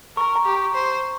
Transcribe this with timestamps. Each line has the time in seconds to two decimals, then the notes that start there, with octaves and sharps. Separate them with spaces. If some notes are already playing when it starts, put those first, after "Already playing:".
0.17 A#4 C#6
0.36 A#5
0.45 G4
0.55 A#5
0.74 C5